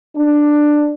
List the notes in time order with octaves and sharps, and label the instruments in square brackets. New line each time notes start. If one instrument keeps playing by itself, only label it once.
[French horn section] D4